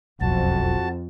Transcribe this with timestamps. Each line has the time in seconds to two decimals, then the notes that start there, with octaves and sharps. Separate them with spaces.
0.21 E1 B1 F2 F#4 A5